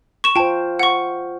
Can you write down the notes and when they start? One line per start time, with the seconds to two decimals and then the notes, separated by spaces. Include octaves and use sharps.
0.24 C#6 E7
0.36 F4 C5 G5 A5
0.79 F#5 C#6